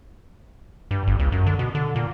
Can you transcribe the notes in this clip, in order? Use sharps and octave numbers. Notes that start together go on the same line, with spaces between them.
G2
G1
C#2
F#2
D3
B2
D3
A#2